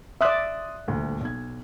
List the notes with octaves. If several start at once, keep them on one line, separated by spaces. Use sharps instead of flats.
D5 E5 C6 D#6 F#6
D#1 D2
B1 G#6